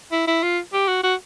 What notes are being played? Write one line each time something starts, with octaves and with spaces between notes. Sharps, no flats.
E4
E4
F4
G4
F#4
F#4